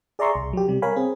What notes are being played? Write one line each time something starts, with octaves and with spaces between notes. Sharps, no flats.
G#4 D5 E5 A#5 C6 C#6
C2
F#3 G4
C3 G3
A#4 C#5 F5 G#5 B5
C4 G#4